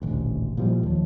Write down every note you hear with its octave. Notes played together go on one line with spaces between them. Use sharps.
D#1 A1 D2
A#2 E3 F3 G3
D#2 F3